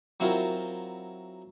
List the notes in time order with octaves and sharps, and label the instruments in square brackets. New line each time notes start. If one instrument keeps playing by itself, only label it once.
[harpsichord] F#3 C4 E4 F4 A#4